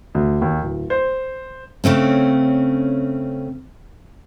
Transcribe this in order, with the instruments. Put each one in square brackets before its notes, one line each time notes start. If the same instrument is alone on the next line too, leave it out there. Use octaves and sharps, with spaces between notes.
[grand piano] D2
D#2
D1
C5
[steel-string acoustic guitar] C#3 A3 C4 C#4